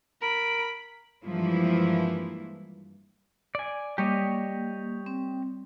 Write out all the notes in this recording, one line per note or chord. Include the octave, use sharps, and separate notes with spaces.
A#4 B5 D7
G2 E3 F3 G#3 A#3 E4
D5 G#5
G3 A#3 G4 C#5 D#5
C4